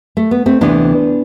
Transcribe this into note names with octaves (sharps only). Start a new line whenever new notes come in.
A3
B3
A3 C4
D2 C3 E3 B3 D4